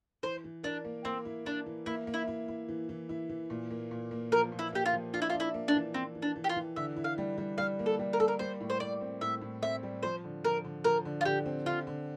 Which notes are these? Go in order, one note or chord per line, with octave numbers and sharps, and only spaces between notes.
E3 C5
E3
D4 A#4
A#3
A#3 C4
E4
D4 E4
E3
A#3 E4
A#3
E4
E4
E4
E3
E3
E4
E3
A#2
A#3
A#2
A#3
F3 A#4
A#2
E4
A#3 G4
F4
F3
D4 F4
E4
F4
D4
E4
A#3
D4
E3
E3 C4
E3
D4
E3
G4
F4
E3
D3 E5
E4
F5
G3
G3
G3 F5
A#3
A4
G3
A#4
A#3 A4
A#4
G3 C5
A2
C5
A2 D5
C4
A2 E5
A2
C4 E5
G3
F3 C5
D3
F3 A#4
D3
F3 A#4
D3
F4
D3 G4
C4
D3 F4
D3